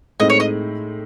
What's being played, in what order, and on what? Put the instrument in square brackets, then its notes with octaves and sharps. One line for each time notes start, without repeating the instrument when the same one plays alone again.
[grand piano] A2 G#3 C4 D#4 [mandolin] D#5
[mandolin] C#5
D#5